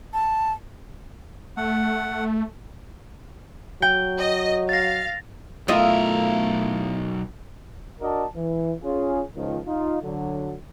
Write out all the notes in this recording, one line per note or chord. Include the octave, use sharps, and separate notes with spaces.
A5
A3 F#5
F#3 G5
D#5
F5 A6 A#6
B1 A3 E4 F4 A#4 D#5
D4 F#4 A#4 D5 D#5 A5
E3
C#4 F4 G#4
C#2 D#3 F3
D#4 F4
D3 F#3